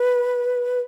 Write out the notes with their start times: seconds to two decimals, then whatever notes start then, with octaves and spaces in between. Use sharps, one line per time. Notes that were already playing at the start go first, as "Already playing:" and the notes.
Already playing: B4